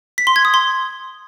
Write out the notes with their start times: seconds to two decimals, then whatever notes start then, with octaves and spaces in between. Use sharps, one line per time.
0.18 B6
0.27 C6
0.36 G#6
0.45 D#6
0.54 C6